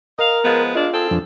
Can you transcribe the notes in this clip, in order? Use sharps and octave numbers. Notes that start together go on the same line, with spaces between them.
A#4 D#5 F5
F3 G#3 B3
G#3 A#3 D4 F4
C4 G#4 A4
F2 F3 D4